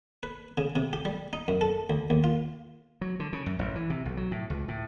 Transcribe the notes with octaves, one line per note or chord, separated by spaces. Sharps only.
B4
C#3
C3
G4
G3
D#4
F#2
A4
D2
D#2
F4
F#3
D3
C#3
F#2
A1
E3
C3
B1
F#3
A2
C#2
A2